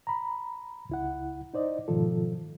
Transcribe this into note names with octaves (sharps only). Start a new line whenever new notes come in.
A#5 B5
C#2 E4 F#5
D#4 C5 D5 D#5
G#2 B2 D#3 F3 F4 A4